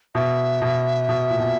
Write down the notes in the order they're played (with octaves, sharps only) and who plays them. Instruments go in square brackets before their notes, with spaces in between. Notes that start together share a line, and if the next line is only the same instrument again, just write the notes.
[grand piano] B2 [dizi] E5
[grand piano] B2
B2
A#2
B2